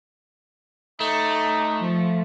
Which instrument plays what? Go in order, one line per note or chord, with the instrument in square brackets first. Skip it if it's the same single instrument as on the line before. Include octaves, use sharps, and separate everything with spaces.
[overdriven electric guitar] A3 [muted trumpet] D#4
[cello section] F3